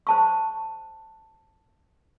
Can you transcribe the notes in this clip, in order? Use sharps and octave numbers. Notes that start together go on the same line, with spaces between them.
C5 A5 C#6